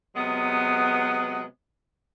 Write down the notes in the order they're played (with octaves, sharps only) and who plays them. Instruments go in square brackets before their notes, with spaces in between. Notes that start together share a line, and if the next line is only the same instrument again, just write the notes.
[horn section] C3 F#3 G#3 B3